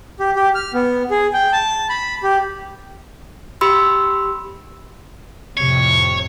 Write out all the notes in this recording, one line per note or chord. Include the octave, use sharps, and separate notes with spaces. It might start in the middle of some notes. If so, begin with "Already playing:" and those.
G4
G4
F6
B3
G#4
G5
A5
B5
G4
G4 B5 C6 E6
F2 A2 C3 C#5